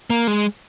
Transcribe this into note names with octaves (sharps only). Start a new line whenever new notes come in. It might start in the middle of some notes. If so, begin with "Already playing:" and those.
A#3
G#3